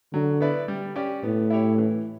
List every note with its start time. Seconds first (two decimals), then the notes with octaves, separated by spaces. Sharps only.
0.14 D3 F#3
0.41 B3 E4 B4 D5
0.68 G3
0.96 C#4 G4 D5
1.23 A2 B3
1.50 E4 G4 C#5
1.78 E3